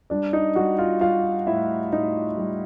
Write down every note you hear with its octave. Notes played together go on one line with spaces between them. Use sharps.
G3 D4 D5
D#4 D#5
G3 F#4 F#5
F4 F5
G3 F4 F5
A2 E4 E5
A2 D#4 D#5
G3